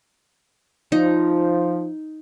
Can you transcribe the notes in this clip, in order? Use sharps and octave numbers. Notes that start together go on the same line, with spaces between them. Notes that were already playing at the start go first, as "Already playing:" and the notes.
F3 D#4